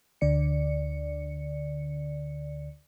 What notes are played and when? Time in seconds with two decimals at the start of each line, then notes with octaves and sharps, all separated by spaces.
0.21 D2 D3 D5 C#7